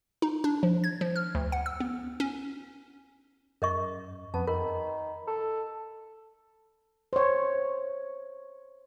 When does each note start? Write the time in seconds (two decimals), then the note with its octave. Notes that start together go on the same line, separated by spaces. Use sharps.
0.22 D#4
0.44 D4
0.63 F3
0.84 G#6
1.01 F3
1.16 F6
1.35 D2
1.52 F#5
1.66 E6
1.80 B3
2.20 C#4
3.62 F#2 A#4 D#5 C#6
4.34 F2 B3 A5
4.48 D#3 A#4 B5
5.27 A4
7.13 C5 C#5